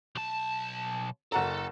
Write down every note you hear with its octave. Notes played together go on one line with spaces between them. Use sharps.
B1 A5
F#1 A4 F#5 A#5